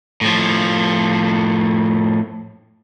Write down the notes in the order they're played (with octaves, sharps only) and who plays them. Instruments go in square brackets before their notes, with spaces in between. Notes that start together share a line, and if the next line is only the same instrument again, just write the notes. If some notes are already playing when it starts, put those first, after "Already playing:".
[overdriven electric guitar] A2 F3